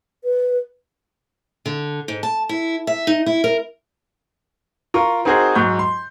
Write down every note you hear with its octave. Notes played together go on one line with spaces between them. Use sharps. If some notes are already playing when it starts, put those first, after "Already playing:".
B4
D3
G#2
A5
E4
E5
D#4
E4
A#4
F4 A#4 C#6
C4 D#4 F#4 G#4 A#4 C5
G#2 F#3 C#6 G6
C6